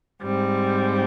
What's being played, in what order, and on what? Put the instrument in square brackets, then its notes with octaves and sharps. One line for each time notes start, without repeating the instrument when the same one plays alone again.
[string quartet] G#2 G3 C4